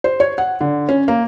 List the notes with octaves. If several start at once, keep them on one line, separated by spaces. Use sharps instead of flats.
C5
C#5
F#5
D3
C#4
A#3